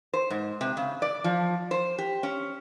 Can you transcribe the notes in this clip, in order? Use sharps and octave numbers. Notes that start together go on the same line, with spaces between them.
C5
G#2
C3
C#3
D5
F3
C5
G4
C#4